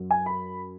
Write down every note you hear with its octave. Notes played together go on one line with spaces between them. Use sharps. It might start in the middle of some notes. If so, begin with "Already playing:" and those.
Already playing: F#2 F#3
G#5
B5